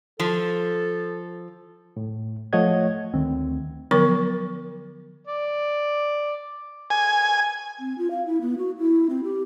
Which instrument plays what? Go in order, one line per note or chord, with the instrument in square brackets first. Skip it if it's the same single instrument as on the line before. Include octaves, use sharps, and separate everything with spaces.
[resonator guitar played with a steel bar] F3 [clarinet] A4
[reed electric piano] A2
F3 A3 C#5 D#5 F#5 G#6
[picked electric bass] D2 D#3 F3 C4
[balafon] D3 F3 F#3 B3 A#4 C#6
[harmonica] D5
[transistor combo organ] G#5
[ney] C4
F4
F5
E4
B3
F#4
E4
C4
G4